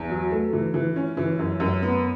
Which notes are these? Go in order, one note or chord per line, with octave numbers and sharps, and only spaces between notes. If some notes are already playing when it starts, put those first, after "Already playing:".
Already playing: E2
F#3
A3
E3
E3
C#4
E3
F#2
F#2
B3